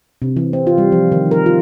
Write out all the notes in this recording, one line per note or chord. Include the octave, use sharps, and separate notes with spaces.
C3
E3
C4
F4
G3
F3
D#3
A#4
F4